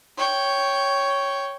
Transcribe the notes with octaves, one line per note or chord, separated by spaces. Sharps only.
C#5 G5